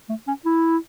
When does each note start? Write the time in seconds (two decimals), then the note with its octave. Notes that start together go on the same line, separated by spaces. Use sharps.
0.09 A3
0.27 C#4
0.45 E4